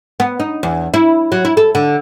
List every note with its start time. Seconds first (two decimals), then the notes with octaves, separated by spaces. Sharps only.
0.20 B3
0.40 D#4
0.63 E2
0.94 E4
1.32 F#3
1.45 E4
1.57 A4
1.75 D3